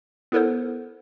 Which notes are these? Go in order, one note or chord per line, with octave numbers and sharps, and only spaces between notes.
B3 E4 A4 A#4 C5